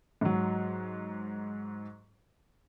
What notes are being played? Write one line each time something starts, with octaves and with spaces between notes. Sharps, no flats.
G#2 F#3